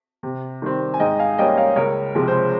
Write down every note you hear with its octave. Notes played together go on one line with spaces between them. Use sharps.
C3
D#3 G3 C4
G#5
G#2 D#5 G5
F5 G#5
G3 A#3 C#4 D#5 G5
C#5 F5
C#2 A#4 C#5
C3 F3 G#3
C5